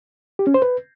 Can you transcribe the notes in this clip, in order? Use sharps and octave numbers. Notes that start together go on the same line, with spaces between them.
G4
C#4
C5
B4